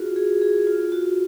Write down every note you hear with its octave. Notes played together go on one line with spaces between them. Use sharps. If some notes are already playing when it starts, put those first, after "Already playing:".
Already playing: F4 F#4 G#4
G#4
G#4
F4
F#4